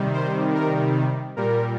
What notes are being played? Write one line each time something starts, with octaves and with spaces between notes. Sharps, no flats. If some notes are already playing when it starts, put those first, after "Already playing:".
Already playing: C3 D#3 G3
C5
A#4
A#2 G3 A#4